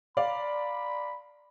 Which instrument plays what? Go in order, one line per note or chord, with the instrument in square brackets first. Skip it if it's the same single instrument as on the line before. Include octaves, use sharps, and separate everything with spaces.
[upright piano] D5 F5 [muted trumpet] B5